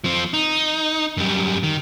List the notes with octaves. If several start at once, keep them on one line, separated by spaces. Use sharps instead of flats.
F3 C4
D#4
F#2 G3
D#3